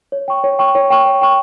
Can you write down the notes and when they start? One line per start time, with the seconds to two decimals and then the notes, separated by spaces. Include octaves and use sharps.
0.12 C#5
0.28 G5 C#6
0.44 C#5
0.59 G5 C#6
0.75 C#5
0.90 G5 C#6
1.05 C#5
1.21 G5 C#6